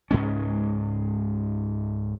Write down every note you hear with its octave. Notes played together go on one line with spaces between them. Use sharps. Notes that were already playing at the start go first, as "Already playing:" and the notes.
C#2 G#2 G#3 C#4